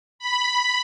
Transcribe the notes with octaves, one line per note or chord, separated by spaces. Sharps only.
B5